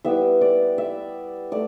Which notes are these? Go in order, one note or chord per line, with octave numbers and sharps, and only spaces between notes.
G3 B3 E4 E5
D5
E5
A3 D5